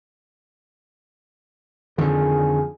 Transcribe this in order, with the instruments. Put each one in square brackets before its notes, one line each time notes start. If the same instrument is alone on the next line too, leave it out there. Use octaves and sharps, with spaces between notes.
[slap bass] F2 D3 D#3 [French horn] G#4